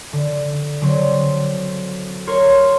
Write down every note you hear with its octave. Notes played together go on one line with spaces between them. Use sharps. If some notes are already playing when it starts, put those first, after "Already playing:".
D3
D3 F#3 C4
A#4 C#5 C6 F6